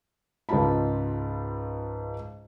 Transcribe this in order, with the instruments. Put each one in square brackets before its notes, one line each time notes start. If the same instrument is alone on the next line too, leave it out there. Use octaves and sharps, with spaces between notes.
[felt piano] C#2 G#2 C#3 F4 A5 B5